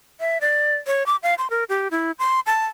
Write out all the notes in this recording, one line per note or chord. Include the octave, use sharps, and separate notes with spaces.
E5
D5
C#5
D6
F5
C6
A#4
G4
E4
C6
A5